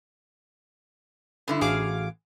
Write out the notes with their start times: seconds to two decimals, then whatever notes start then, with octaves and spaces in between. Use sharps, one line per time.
1.48 G2 D3 E4
1.61 A1 F#4 G#4 F5 D6